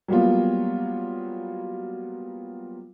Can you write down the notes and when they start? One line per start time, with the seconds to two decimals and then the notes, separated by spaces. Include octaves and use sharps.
0.08 F#3 G3 A#3 B3 F4